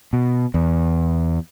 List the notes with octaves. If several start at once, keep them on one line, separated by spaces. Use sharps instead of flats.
B2
E2